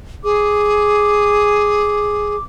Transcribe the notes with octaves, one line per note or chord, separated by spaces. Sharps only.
G#4 D6